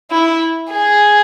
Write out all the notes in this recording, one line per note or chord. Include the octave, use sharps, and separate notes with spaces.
E4
G#4